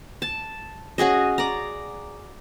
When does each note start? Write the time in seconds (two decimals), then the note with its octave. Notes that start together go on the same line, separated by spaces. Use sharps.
0.22 A5
0.98 C#4 F#4 G#4 D#5
1.38 D5 A#5